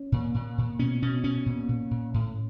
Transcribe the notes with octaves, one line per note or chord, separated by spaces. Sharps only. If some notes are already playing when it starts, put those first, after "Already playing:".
Already playing: C#4
A#2
A#2
A#2
B2 C#4
B2 C#4
B2 C#4
A#2
A#2
A#2
A2